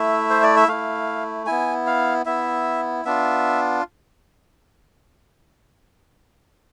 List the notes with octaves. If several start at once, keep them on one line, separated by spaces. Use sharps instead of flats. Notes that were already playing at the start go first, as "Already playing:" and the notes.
Already playing: A3 E4 E5
C5
D5
E5
A3 E4 F5
B3 E4 G#5
F5
B3 E4 E5
B3 D4 F4 E5